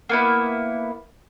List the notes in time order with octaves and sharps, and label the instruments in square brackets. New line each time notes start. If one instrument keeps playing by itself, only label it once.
[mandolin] A#3 B3 E4